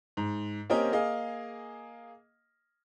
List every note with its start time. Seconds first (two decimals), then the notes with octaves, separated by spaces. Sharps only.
0.17 G#2
0.70 A#3 C4 C#4 G4 A#4 D#5
0.92 A#3 G#4 D#5 F5